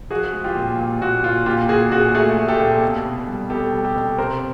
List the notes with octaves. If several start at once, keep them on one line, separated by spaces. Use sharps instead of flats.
F3 F#4 G#4
G#3
F4 G4
A#2
A#2
A#2 F#4
A#2 F4
A#2 F4 G4
A#2 F#4 G#4
A#2 F#4 G#4
A3 F#4 G#4
A3
G4 A4
A#2
B2
B2
G3
B2 G4 A4
G3
G4 A4
B2
C3 A#4 C5